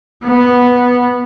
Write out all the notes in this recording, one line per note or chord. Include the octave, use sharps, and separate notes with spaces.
B3